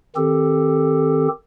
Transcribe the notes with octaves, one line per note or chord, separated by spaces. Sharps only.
D#3 C4 G4 A4